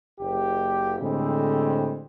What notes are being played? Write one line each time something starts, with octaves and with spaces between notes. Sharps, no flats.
F#1 G4
A2 D3 G3 G#3 C4